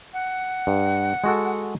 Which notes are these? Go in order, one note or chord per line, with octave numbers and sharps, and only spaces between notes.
F#5
G2
G#3 F#4 A4